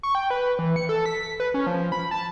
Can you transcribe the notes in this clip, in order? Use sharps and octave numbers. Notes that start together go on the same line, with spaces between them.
C#6
G5
B4
E3
C#7
A4
B6
B4
C#4
F3
B5
A5